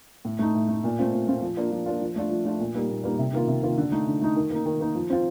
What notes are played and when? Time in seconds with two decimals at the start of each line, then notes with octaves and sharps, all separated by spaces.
0.25 A2
0.39 A3 D#4
0.55 A2
0.69 A3 D#4
0.84 A#2
0.98 A3 C4 F4
1.13 A#2
1.27 A3 C4 F4
1.42 F3
1.57 A#3 D4 F4
1.71 F3
1.86 A#3 D4 F4
2.01 F3
2.16 A3 D4 F4
2.31 F3
2.45 A3 D4 F4
2.60 A#2
2.74 G3 A#3 D#4
2.89 A#2
3.04 G3 A#3 D#4
3.18 C3
3.33 D#3 A#3 F4
3.48 C3
3.62 D#3 A#3 F4
3.78 D3
3.92 A3 D#4
4.07 D3
4.22 A3 D#4
4.36 D#3
4.50 A#3 D#4
4.66 D#3
4.80 A#3 D#4
4.95 F3
5.10 C4 F4